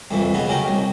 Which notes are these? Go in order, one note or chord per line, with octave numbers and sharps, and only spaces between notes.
C2 F2 E3
C#3 B3 D#4
F#3 C#4 A#4 G5
C2